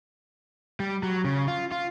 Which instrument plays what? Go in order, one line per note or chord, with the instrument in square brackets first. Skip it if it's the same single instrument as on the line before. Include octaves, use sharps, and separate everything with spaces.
[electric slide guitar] G3
F#3
C#3
F4
F4